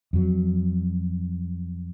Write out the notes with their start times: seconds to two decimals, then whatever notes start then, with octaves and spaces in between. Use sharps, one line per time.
0.13 F2 F#3